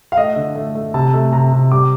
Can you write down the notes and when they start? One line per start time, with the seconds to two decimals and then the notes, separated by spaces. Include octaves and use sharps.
0.12 F5
0.17 A3 D#5
0.36 D3
0.55 A3
0.75 A3
0.94 C3 A5
1.14 A3
1.32 C3 A#5
1.52 C3
1.72 G3 D6